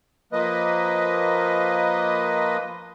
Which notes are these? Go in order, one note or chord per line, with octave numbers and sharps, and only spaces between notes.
F3 A#3 B4 D#5